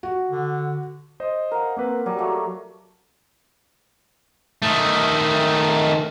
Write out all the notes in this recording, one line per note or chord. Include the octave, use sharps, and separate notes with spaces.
F#4
D3
C5 D#5
A#4 F5 F#5
A#3 C4 B4 D6
F#3 G3
A3 A#3 F#4
D#3 A3